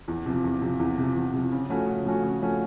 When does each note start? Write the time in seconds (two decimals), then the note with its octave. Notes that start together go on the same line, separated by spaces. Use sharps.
0.08 E2
0.26 C3 F3
0.44 E2
0.62 C3 F3
0.80 E2
0.98 C3 F3
1.15 E2
1.34 C3 F3
1.52 C#3
1.69 F3 A3 C#4 F#4
1.87 C#3
2.06 F3 A3 C#4 F#4
2.23 C#3
2.41 F3 A3 C#4 F#4